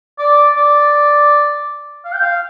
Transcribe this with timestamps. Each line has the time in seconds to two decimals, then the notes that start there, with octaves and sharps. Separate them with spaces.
0.19 D5
0.57 D5
2.05 F5
2.13 G5
2.21 F5